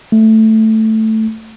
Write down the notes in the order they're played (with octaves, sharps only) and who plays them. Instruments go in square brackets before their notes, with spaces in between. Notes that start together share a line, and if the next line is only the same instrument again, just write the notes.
[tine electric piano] A3